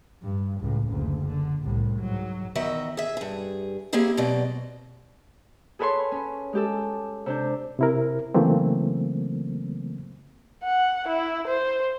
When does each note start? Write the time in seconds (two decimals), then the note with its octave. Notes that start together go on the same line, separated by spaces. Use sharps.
0.22 G2
0.60 C#2 A2
0.89 F#1 D2
1.28 D3
1.62 C2 A2
2.00 G#2 F#3
2.55 E2 D#3 F#4 D#5 E5
2.97 G#4 E5
3.17 G2 G#4
3.93 A#3 C4 E4 G4 G#4 C5
4.17 B2 F#3 C4 D5 D#5
5.79 G#4 A4 B4 C#5 G#5 C6
6.12 C#4
6.53 G#3 G4 A4
7.26 C3 D4 G6
7.79 C3 E4 A#4
8.34 C#3 E3 F#3 A3 A#3 C4
10.64 F#5
11.08 E4
11.47 C5